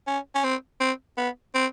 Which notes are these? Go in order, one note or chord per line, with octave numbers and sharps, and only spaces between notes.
C#4
C#4
C4
C4
B3
C4